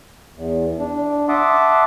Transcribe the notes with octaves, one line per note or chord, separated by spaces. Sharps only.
E2
D4
E5 F#5 A5 C6 D6 D#6